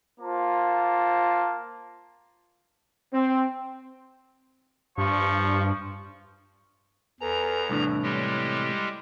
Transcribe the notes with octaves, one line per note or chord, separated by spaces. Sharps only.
A#3 F4 C5 A5
C4
G2 F3 C#6
E2 A4 B4 G#5 A#5
C2 A2 E3 D4
G3 G#3 G4 C#5